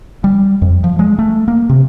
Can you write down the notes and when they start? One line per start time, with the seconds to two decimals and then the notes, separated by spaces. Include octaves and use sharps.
0.24 G3
0.62 F2
0.84 F3
0.99 G#3
1.19 A3
1.48 A#3
1.69 C3